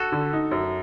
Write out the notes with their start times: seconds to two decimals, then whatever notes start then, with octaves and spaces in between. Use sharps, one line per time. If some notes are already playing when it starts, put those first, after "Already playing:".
Already playing: F#4 A4
0.12 D3
0.33 D#4
0.51 F#2